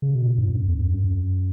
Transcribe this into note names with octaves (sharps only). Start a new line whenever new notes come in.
C#3
B2
A#2
G2
F#2
E2
G2
F#2
F#2